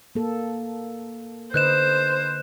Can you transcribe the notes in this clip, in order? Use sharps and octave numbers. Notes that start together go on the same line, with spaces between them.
A#3 A4
D3 B4 C5 D#5 F#6 G6 E7